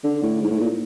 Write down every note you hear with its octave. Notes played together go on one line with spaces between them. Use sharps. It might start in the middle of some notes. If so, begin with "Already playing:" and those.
D3
A2
G#2
A2
A#2